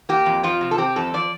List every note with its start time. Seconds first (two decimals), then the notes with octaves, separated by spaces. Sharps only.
0.09 A#3 G4
0.26 F2
0.43 F3 F4
0.61 C3
0.71 A4
0.78 C4 G4
0.96 F2 A4
1.14 F3 D5